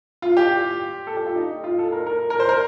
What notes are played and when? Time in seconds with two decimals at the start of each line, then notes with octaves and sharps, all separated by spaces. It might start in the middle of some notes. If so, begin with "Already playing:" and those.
0.22 F4
0.37 G4
1.07 A4
1.17 G4
1.26 F4
1.35 D#4
1.64 F4
1.79 A4
1.92 A#4
2.07 A#4
2.30 A#4
2.40 C5
2.49 A#4